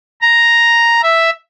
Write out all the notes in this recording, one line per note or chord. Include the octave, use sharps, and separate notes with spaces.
A#5
E5